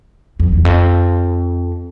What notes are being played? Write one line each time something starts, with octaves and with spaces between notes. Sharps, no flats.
F2
E2
F2